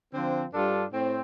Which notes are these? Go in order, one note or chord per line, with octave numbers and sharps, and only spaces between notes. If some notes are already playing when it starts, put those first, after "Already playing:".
D3 F3 C4
G2 G3 D4 F4 A4
A2 C4